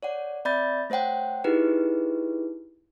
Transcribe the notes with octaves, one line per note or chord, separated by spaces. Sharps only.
C#5 D5 F#5
C4 D5 E5 B5 G6 A6
A3 C5 C#5 F#5 G5
D#4 E4 G4 G#4 B4